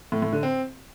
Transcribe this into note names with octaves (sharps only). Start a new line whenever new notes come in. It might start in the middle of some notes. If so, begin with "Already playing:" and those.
A2
A2
D3
C4